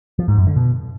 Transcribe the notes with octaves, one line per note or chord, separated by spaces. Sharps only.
F3
G#2
F#2
D3
B2